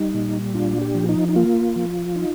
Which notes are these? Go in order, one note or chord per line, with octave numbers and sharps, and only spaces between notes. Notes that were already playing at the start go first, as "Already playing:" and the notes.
Already playing: G3 D#4
A#2
D4 F4
G4
F3
D#4
D#4
A#3 F4
F3
D#4